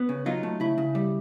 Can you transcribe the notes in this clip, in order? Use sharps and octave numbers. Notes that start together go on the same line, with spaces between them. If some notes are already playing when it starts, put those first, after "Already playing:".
Already playing: B3
C#3
F#3 D#4 F4
A3
C#3 E4
C#3
G3